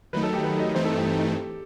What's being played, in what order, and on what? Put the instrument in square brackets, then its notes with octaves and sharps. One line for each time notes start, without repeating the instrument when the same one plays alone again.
[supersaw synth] D#3 F#3 A3 D#4 [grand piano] B4
[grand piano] A4
G4
B4
D#5
[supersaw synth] G2 E3 A3 C4 D#4 [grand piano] C5
[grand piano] A4
G4